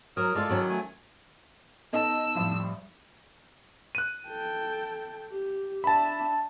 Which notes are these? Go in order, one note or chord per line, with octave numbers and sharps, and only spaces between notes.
F#3 A#4 D#6 F6
G#3 F4 A4 D5 F6
D#3 F#3 C#4
A3 G#5
B3 C#4 D#4 A4 D#5 A5 E6
F2 A2 F3 G3
F#6 D#7
A4 G5
G4
D4 E5 A5 B5